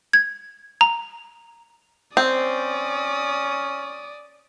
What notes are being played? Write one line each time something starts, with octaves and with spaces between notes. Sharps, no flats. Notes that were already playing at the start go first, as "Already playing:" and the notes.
G#6
A#5
C4 C#4 D5 D#6